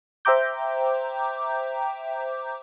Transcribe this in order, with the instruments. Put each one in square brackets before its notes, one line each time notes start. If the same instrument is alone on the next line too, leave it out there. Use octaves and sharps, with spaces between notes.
[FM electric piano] C5 E5 G5 A#5 D6 G6